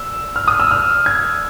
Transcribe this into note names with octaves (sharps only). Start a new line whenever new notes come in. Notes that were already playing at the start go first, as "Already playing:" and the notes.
Already playing: E6
F6
D#6
E6
F6
G#6